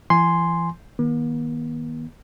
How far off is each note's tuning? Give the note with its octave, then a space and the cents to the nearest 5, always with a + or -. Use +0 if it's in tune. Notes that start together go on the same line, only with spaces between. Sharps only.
E3 +40 G#5 +0 C6 +0
D#3 +15 A#3 +45